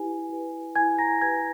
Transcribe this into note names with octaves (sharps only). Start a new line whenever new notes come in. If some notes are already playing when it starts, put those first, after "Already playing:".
Already playing: E4 G4 B4 G#5
G4 B4
E4 G#5 G#6
A#5 A#6
G4 B4 G#5 G#6